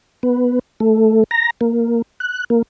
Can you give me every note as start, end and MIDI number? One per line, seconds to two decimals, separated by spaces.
0.23 0.59 59
0.80 1.24 57
1.31 1.50 82
1.61 2.02 58
2.20 2.44 90
2.50 2.62 58